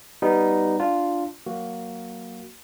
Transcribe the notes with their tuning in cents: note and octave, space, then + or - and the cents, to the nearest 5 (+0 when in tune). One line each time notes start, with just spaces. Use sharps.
G3 +0 B3 +0 D#4 -5
D4 +0 F4 +0
F#3 +0 A#3 +0 F#4 +5